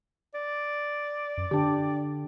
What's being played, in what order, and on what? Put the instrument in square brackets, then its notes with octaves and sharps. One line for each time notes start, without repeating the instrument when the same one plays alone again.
[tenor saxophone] D5
[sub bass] F#2
[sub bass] D3 [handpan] D4 G4